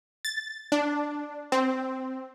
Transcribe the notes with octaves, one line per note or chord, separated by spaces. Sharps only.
A6
D4
C4